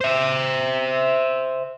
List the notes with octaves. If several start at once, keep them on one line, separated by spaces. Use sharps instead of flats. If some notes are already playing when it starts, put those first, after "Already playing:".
C5 E5